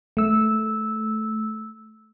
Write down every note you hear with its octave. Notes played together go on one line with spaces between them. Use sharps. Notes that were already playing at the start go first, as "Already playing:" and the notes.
A3 E6